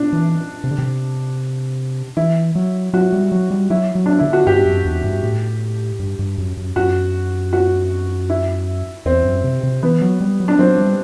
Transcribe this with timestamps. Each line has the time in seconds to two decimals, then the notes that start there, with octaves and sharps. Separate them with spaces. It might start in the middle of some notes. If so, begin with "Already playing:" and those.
Already playing: D4
0.13 E3
0.64 C3
0.71 D3
0.78 C3
2.17 E3 E4
2.55 F#3
2.93 F#3 F#4
3.13 G3
3.32 F#3
3.51 G3
3.70 F#3 E4
3.95 F#3
4.06 D4
4.19 D3 E4
4.33 F#4
4.47 G2 G4
4.65 F#2
4.85 E2
5.04 G2
5.23 A2
6.00 G2
6.19 G2
6.38 F#2
6.57 F#2
6.76 F#2 F#4
7.53 F#4
8.30 E4
9.06 E2 C4
9.25 F#2
9.44 C3
9.63 C3
9.83 E3 B3
10.02 F#3
10.21 G3
10.40 F#3
10.48 D4
10.59 F#3 C4
10.78 G3